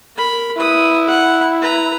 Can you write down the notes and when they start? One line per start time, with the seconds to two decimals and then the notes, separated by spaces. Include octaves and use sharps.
0.16 A#4 B5
0.58 E4 B4 D#6
1.08 F#5
1.62 B4 A#5